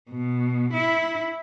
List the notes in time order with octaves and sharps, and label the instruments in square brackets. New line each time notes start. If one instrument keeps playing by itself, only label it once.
[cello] B2
E4